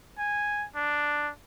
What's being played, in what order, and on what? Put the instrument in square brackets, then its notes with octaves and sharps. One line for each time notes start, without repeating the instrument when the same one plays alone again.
[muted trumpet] G#5
D4